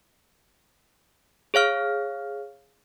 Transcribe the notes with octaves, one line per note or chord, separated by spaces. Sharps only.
G#4 C#5 F5 F6